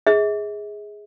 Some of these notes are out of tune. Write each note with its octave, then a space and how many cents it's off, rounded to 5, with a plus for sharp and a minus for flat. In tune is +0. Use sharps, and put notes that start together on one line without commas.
G#4 +0 E5 -45